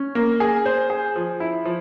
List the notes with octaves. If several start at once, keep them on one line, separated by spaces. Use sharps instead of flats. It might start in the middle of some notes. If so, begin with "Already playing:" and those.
Already playing: C#4
A#3
G#4
C5
G#4
F3
E4
F3